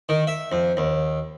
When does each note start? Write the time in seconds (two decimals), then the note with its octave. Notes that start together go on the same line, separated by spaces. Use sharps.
0.09 D#3
0.27 E5
0.52 F2
0.77 D#2